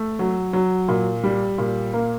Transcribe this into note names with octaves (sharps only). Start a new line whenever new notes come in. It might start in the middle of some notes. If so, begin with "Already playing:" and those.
Already playing: A3
F#3
F#3
A#2
G3
A#2
A#3